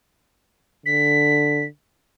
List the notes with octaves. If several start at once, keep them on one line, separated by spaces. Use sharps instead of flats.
D3 B6